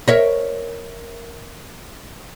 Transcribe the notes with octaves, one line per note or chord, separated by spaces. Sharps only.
A#4 C#5 E5